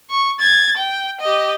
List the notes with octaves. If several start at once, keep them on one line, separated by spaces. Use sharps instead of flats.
C#6
G#6 A6
G5
G4 D#5